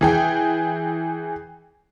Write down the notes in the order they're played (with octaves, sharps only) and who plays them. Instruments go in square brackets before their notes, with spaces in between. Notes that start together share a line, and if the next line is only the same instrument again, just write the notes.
[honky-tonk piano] E3 G#4 G5